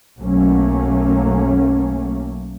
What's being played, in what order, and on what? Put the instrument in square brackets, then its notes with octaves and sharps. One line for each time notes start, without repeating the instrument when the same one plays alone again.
[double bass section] B1 F#2 F#3 A3 A#3 C#4